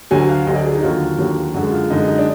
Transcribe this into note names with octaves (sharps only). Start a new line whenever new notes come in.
D2 D3 F#3 G#5
F5
D2 D3 F#3 D#5
D5
G#4
D#4
D#2 D3 F#3 F4
D#2 D3 F#3
F#2 D3 G#3 F#4
F4
F#2 D3 G#3 D#4
D#4
D4